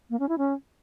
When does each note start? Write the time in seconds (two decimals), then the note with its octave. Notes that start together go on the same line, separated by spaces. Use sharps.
0.10 A#3
0.19 C#4
0.29 E4
0.38 C#4